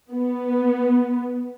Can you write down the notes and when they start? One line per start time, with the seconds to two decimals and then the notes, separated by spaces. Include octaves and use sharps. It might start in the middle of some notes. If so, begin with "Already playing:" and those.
0.12 B3